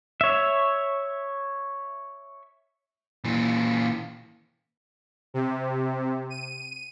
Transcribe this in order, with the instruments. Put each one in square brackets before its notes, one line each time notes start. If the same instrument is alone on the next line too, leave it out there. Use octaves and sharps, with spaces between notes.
[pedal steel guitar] C#5 E5
[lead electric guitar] A#2 E3
[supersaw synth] C3
D#7